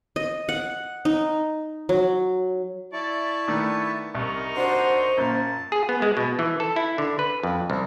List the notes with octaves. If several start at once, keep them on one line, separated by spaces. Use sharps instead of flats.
D#5
F#5
D#4
F#3
E4 D5 A5 C#6
D#3 A3 B3 D4
C2 D#4 A#4 C#6
D4 F#4 C5 C6
F#2 A#2 A5
G#4
B3
G#3
B2
E3
A4
E4
D3
B4
F2
C2